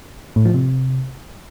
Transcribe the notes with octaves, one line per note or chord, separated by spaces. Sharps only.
A2
F3
C3